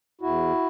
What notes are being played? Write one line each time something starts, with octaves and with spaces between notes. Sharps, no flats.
E2 E4 F#4